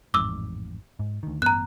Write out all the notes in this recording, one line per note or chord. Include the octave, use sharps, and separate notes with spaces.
A1 F2 G#2 D6 E6
G#2
D2 D#3
A1 G2 B3 A#5 F#6